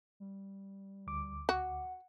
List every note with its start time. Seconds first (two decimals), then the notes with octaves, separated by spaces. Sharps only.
0.20 G3
1.07 D2 D6
1.49 F#4 F#5